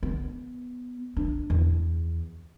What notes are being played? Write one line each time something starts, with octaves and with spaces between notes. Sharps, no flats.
B3
D4
E2